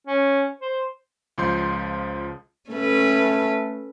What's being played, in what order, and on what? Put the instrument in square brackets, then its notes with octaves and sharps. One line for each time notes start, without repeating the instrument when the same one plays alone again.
[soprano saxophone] C#4
C5
[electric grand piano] C#2 F3 C6 G6
[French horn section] A3 [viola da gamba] C#4 A4 B4